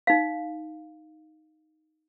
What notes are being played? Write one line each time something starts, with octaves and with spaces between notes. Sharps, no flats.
D#4 F5